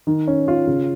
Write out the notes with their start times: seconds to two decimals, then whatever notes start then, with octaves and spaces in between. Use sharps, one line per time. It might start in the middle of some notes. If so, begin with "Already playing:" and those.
0.07 D#3
0.27 C#4
0.48 F4
0.67 C#3